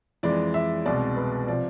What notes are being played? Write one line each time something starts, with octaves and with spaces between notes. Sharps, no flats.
F2 E3 G#3 D5
E5
C2 B2 G#3 D5
B4
C3 F3 D5